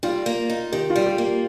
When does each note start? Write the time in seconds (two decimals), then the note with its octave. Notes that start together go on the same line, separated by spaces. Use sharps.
0.03 G3 F4
0.26 A#3
0.50 D#4
0.72 D#3 G4
0.90 F4
0.96 G3
1.06 G4
1.18 A#3